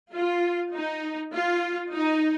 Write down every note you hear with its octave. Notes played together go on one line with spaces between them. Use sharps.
F4
D#4
F4
D#4